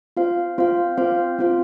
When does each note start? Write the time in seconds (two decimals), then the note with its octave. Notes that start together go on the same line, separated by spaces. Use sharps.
0.17 C4 F4 C5 F5
0.58 C4 F4 C5 F5
0.98 C4 F4 C5 F5
1.39 C4 F4 C5 F5